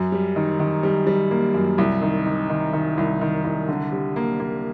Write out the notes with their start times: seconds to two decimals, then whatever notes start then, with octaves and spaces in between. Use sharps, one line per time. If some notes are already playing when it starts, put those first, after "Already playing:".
Already playing: F#2
0.12 G3
0.36 D#3
0.59 D#3
0.83 G3
1.07 G3
1.31 A#3
1.54 F#2
1.78 C2
2.02 D#3
2.26 D#3
2.49 D#3
2.73 D#3
2.98 C2
3.21 D#3
3.44 C2
3.68 D3
3.92 G3
4.16 A#3
4.39 A#3